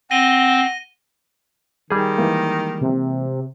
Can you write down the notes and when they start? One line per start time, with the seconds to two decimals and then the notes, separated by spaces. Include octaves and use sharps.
0.11 C4 F#5 A#6 D#7 G7
1.90 D#3 G3 G#4
2.18 E3 G#3 A#3
2.81 C3